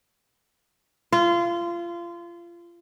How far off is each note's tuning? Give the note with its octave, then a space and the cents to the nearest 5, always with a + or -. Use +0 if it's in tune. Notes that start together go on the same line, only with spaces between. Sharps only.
F4 -25